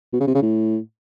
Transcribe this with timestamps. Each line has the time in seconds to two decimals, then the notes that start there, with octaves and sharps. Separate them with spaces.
0.13 B2
0.20 C#3
0.28 C3
0.35 C#3
0.42 A2